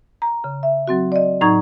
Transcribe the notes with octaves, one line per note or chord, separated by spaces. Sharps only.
A#5
C#3
E5
F#3 C4 F#4
D5 D#5
A2 F#3 D#4 A#5 C#6 G#6